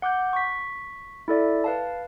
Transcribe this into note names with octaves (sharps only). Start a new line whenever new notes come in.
F#5 D6 F#6 G6
C#6 B6
E4 A4 D5 E5
B4 F5 A5